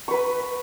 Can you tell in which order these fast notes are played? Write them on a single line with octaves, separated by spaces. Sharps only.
C#6 B4 B5